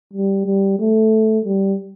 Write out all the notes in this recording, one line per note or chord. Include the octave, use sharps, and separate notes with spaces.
G3
G3
A3
G3